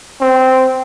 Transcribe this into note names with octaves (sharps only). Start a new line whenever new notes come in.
C4